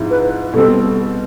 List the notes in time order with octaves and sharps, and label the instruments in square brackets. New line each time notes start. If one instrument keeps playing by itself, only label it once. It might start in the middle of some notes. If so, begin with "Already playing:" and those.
Already playing: [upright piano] G#2 F3 C4 E4
[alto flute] B4
[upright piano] B2 G3 C4 [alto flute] A4